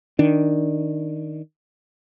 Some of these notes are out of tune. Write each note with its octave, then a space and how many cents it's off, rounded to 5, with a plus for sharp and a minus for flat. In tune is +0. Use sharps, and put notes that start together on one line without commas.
D#3 +0 D4 +0